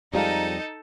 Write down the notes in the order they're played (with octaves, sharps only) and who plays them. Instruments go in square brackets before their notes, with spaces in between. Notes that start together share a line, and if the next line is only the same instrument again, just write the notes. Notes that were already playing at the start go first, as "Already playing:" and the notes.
[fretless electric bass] F2 G3 [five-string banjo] G#3 C4 F4 [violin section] D#4 [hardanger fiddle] A4